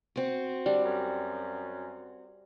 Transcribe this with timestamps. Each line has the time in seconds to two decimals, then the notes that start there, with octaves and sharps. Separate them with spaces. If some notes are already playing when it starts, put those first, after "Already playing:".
0.16 C4 F#4
0.66 G3 D4
0.85 F#2